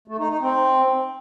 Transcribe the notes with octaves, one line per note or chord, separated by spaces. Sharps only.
A3
D#4
D#4
C4